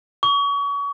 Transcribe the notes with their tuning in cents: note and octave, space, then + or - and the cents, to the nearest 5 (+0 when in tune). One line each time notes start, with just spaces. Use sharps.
C#6 +35